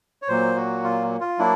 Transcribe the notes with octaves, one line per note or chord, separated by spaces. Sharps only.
C#5
A#2 F#3 A#3 C5
F#4
F4
F4
F#3 A#3 D4 E4